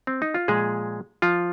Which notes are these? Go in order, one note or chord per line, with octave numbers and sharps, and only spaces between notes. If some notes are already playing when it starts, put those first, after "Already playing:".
C4
D#4
F4
A#2 F3 G#3 G#4
F3 F4